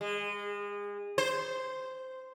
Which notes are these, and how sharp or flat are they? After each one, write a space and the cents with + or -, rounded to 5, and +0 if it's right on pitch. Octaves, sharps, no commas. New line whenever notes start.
G#3 -30
C5 -10